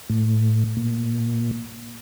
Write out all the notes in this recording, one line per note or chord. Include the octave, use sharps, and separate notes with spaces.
A2
A#2